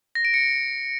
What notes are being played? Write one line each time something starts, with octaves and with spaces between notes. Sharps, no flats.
A#6
D7
C#7